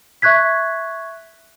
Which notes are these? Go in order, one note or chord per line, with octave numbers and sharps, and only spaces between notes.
E5 C#6 F#6 G#6 B6